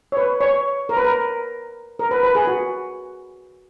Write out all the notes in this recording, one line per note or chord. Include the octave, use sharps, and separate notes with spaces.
C#5
B4
C#5
A#4
B4
A#4
A#4
B4
B4
G#4
F#4